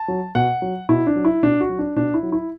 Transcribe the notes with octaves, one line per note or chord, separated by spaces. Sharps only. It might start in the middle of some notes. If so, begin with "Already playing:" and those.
Already playing: A5
F#3
B2 F#5
F#3
B2 E4
D4
F#3
E4
B2 D4
F#4
F#3
D4
B2 D4
E4
F#3
E4